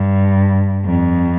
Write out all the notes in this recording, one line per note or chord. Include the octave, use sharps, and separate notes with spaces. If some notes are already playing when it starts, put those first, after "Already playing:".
Already playing: G2
F2